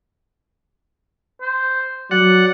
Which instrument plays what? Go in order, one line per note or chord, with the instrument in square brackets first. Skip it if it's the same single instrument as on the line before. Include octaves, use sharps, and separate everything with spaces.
[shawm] C5
[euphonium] F#3 [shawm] D5 [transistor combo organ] F#5